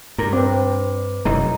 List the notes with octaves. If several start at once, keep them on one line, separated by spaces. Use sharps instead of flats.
G2 A#4
C4 D4 B4 D6
E1 F#2 E3 D#4 A#5